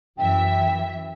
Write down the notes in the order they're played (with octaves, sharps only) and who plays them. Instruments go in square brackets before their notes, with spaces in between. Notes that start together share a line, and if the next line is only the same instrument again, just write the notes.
[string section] F#2 E3 E5 [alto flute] G5